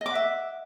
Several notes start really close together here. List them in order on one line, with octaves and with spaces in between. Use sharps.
D#5 D6 F#5 E5